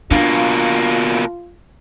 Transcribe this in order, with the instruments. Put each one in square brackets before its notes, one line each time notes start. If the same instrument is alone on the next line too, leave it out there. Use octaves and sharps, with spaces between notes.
[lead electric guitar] B2 A#3 [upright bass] D4 [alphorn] F4